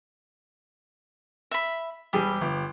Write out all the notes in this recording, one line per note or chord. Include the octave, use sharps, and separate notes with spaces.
E5 B5
E1 G3 G4 G#4
G1